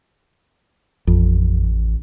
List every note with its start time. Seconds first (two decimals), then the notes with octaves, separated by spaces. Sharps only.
1.07 A1 F2